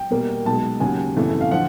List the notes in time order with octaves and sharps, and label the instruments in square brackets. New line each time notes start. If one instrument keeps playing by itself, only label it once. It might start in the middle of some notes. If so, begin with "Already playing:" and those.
Already playing: [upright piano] G5
E2 B2 G3 A#3
B1 B2 G#3 A5
D#2 C#3 F#3 G#5
G1 F2 C#3 E3 A3
F5
D3 F3 F#5